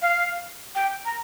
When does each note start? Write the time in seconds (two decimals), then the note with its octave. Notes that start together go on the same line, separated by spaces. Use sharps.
0.02 F5
0.75 G5
1.05 A#5